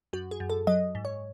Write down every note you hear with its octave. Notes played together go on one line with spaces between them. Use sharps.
F#2 F#4
G#4
F#2
A4
F#3 D#5
G#2
C#5